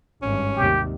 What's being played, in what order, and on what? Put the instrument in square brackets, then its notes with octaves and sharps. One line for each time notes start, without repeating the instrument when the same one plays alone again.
[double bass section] G#1 G2 [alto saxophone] C#4
[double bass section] D#2 C3 G3 [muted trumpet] G4